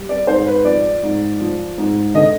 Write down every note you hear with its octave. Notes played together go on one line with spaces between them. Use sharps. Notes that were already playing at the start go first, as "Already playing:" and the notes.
Already playing: G3
D5
G#2 C5
B4
F3 D5
G#2
F3
G#2
D3 D#5